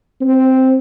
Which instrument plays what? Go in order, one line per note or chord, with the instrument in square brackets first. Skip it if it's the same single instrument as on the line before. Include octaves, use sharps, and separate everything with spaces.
[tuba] C4